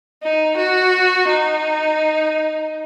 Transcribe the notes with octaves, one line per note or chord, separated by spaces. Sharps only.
D#4
F#4
D#4